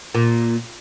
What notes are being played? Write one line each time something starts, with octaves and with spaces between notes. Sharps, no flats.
A#2